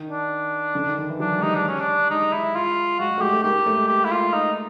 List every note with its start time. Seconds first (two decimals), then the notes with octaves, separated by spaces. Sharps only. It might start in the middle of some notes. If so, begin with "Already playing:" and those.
Already playing: D#3
0.08 D4
0.75 D3
0.86 D#3
0.98 D#3
1.09 E3
1.20 F#3 D4
1.37 G#3
1.42 G3 D#4
1.55 D4
1.68 C#4
1.80 D4
2.09 G#3 D#4
2.33 E4
2.55 F4
2.99 G#3 F#4
3.11 G#3
3.18 A3
3.21 G#3 G4
3.33 A3
3.44 A#3 G4
3.56 A#3
3.67 A3
3.78 G#3
3.88 G4
4.05 E4
4.11 F4
4.33 D#4